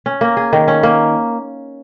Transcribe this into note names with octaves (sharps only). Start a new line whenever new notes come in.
C#4
A#3
G#4
D#3
C#4
A#3